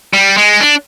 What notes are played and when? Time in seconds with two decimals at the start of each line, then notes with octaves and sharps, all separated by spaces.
0.13 G3
0.37 G#3
0.61 D4